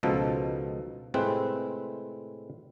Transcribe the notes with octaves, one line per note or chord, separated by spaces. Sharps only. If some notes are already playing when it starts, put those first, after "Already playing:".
C#2 B2 F3 D#4 A4
A2 C3 G#3 C4 E4 B4